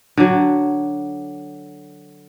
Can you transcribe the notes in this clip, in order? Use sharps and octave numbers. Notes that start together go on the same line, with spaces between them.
D3 F#3